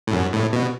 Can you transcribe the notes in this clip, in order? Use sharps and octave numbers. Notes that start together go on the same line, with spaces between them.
A2
F#2
A2
B2